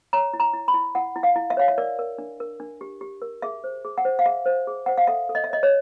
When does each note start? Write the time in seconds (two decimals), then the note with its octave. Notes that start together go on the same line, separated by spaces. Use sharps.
0.13 C#5 A#5
0.33 E4
0.40 A#5
0.53 E4
0.68 B5
0.74 E4
0.95 E4 F#5
1.16 E4
1.23 F5
1.36 E4
1.50 E5
1.57 C#5 F5
1.68 E5
1.78 A#4 D5
1.99 A#4
2.18 D4
2.40 A#4
2.60 D4
2.81 G4
3.01 G4
3.22 A#4
3.42 G#4 E5
3.64 C5
3.85 G#4
3.98 F#5
4.05 C5
4.19 F5
4.26 G#4 E5
4.46 C5
4.67 G#4
4.86 C5 F#5
4.98 F5
5.07 A4 E5
5.29 A4
5.35 D#5
5.44 E5
5.50 C#5 D#5
5.63 C#5